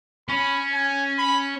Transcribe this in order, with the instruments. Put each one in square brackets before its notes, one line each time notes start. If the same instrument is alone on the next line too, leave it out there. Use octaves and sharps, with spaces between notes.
[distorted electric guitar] C#4 [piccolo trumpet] B5
[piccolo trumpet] G#5
B5